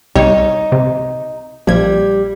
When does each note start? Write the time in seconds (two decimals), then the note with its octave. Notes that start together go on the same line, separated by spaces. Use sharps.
0.15 C2 G3 D#4 C#5
0.72 C3
1.67 A#1 F3 G3 G#6